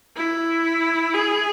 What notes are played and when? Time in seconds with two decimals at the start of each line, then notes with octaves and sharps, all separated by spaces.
0.16 E4
1.14 G#4